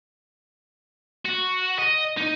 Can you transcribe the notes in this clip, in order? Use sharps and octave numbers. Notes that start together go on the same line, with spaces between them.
F#4
D#5
D#4